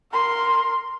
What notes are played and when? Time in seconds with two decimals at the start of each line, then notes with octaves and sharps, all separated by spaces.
0.12 A#4 C6